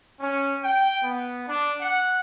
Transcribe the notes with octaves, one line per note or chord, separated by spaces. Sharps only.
C#4
G5
B3
D4
F#5